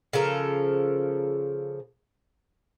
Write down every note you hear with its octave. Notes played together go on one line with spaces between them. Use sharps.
C#3 F3 A4 A#4